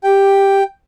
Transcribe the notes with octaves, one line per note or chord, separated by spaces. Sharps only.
G4 G5